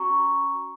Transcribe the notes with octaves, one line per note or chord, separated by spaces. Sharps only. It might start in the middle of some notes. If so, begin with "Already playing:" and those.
Already playing: C#4 F#4 A#5 C#6